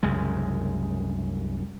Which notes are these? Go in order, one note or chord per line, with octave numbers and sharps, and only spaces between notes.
C2 F#2 C#3 G#3